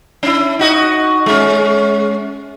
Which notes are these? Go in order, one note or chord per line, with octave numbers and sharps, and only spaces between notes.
C#4 E4
D#4 F#4 D#5
G#3 C#4